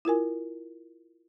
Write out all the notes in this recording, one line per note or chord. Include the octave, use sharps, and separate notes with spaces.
E4 F4 A#4 G#5